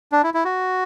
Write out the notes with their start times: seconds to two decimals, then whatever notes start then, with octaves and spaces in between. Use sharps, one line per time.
0.12 D4
0.23 E4
0.34 E4
0.45 F#4